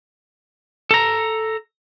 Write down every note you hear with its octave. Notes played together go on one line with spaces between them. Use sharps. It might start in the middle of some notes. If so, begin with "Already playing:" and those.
A4 A#5